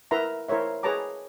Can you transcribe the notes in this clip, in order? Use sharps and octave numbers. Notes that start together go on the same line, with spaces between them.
E4 A#4 B4 E5 A#5 C6
E4 A#4 C5 C#5 E5
G#4 B4 C#5 A5 A#5 D6